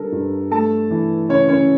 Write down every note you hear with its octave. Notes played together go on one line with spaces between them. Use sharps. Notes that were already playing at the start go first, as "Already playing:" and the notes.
Already playing: D3 G3 A4 A#4
G2
A3 A4 A5
E3
C#3 C#4 C#5
C#4 C#5